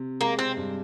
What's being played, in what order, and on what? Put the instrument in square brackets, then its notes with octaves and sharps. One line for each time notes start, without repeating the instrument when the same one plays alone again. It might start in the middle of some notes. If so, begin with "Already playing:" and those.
Already playing: [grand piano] C3
[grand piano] G#3 [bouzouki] A#3
[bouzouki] C4
[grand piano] G2